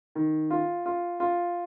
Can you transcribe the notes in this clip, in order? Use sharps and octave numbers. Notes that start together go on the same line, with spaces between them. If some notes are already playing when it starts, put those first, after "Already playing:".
D#3
F4
F4
F4